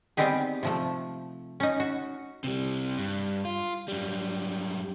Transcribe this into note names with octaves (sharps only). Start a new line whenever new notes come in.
G3 B3 C4 D#4 G4 G#4
C3 F3 A3
C#4 D#4
F#4
C3 G3
G2
F4
F#2 G3